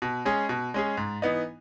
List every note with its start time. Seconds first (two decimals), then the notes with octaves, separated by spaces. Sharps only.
0.02 B2
0.25 G#3 C#4 G#4
0.49 B2
0.74 G#3 C#4 G#4
0.97 G#2
1.22 E3 B3 D#4